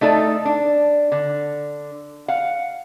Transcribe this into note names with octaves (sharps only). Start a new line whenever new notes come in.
A3 D#4 A4 D5
D4
D3
F5 F#5